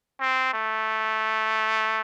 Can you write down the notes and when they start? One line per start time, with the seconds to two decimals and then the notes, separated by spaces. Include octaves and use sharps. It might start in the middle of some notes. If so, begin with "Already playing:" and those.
0.20 C4
0.54 A3